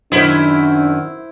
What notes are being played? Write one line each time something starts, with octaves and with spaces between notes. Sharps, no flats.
F#2 D#3 D4 E4 C5